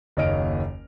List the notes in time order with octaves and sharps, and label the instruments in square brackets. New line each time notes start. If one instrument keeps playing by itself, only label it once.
[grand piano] F#1 D#2 C#5 D#5 F6 D7